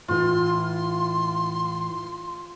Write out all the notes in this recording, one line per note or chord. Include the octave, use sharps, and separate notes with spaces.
A2 E3 F4 C6